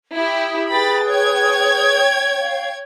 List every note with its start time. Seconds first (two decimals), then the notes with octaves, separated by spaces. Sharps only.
0.15 E4 G4 E5 D#6
0.71 G#4 B4 G5 B5 D#6 A6
1.06 C#5 G5 G#6
2.41 F5